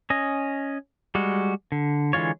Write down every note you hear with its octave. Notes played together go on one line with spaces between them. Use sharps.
C#4 D#5
G3 G#3 F#4
D3
D3 E3 G#3 F4 C#5